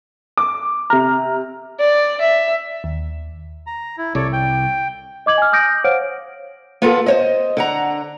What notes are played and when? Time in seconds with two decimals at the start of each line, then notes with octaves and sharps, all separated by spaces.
0.38 D6
0.90 C3 A#5 F6
1.80 D5
2.21 E5
2.84 D#2
3.67 A#5
3.98 E4
4.15 C2 A4 C#5 D5
4.33 G5
5.26 D#5 D6 G#6 F#7
5.38 G#5 F6
5.52 D6 D#6 G6 A#6 D7
5.84 C5 C#5 F5 F#5 F6 D7
6.82 A#3 B3 F4 G#4 A4
7.06 C5 C#5 D#5
7.57 D3 F#5 A#5